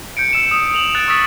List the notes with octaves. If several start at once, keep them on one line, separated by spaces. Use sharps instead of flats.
G6 C#7 D7
E6 E7
D#6
F7 F#7
F#6 A6 D7
C#6 D#6 E6 A6 B6